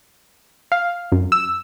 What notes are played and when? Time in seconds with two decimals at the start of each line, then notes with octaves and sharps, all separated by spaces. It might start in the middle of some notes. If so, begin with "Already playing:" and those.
0.72 F5
1.12 F#2
1.32 E6